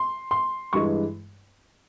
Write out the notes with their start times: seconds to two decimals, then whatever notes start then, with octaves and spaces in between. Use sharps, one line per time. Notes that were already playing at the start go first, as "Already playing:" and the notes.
Already playing: C6
0.31 C6
0.73 G2 E3 G#3 C#6